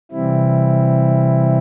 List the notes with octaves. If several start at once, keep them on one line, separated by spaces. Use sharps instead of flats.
C3 E3 G3 C4 E4